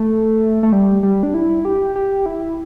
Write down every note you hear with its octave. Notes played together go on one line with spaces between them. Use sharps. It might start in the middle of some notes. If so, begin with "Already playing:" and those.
Already playing: A3
A3
G3
G3
D4
E4
G4
G4
E4